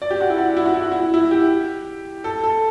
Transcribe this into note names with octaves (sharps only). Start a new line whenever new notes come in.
D5
G4
F#4
E4
F#4
E4
F#4
E4
F#4
E4
E4
G4
A4
A4